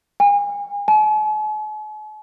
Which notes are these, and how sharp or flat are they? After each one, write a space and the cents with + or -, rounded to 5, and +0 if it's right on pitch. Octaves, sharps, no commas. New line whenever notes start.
G#5 -40
G#5 +45